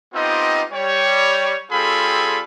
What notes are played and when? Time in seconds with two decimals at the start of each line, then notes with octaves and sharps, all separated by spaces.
0.14 B3 C4 D#4 F4 G4 D#5
0.73 G3 C#5
1.72 G3 C4 F4 G#4 A4 B5